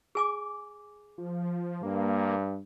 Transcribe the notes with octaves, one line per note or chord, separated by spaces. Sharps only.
G#4 G#5 D6
F3
G2 A#3